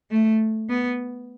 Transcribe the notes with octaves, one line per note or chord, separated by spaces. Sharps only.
A3
B3